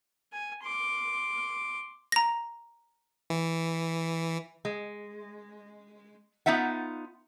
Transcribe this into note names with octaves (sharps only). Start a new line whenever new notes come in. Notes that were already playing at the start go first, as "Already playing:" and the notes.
G#5
C6 D6
A#5 A#6
E3
G#3
B3 D#4 F4 E5 F#5